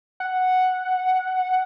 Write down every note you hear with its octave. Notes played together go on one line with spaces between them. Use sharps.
F#5